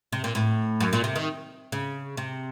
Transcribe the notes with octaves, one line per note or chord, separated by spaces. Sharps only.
C3
A#2
A2
F#2
A#2
C3
D#3
C#3
C3